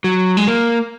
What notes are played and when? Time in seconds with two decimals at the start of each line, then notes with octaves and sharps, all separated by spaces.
0.04 F#3
0.37 G#3
0.48 A#3